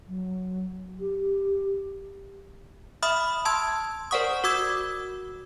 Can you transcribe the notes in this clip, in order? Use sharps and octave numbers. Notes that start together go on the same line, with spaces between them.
F#3
G4
E5 B5 D#6 F6
A5 C6 E6 G#6
A#4 C5 D5 F#5 C#6 D#6
F#4 D6 E6 G#6